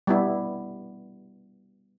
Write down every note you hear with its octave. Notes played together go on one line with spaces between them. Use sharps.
G3 B3 E4